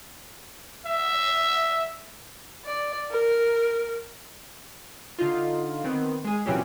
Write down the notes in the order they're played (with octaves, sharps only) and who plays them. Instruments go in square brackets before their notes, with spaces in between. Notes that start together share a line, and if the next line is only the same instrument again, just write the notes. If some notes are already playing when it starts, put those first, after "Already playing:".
[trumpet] E5
[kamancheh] D5
A#4
[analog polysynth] D3 D#4 F4
D#3 B3 C4
G#3 G#4
A#2 E3 F#3 C4 C#4 G4